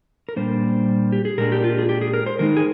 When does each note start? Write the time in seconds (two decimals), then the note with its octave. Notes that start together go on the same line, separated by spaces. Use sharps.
0.29 A#4
0.36 A#2 G3 A#3 D4 C5
1.12 G4
1.25 G#4
1.38 A#2 G#3 D4 A#4
1.52 G4
1.64 F4
1.78 G#4
1.89 G4
2.02 G#4
2.14 A#4
2.26 C5
2.39 D#3 G#3 D#4 A#4
2.57 G#4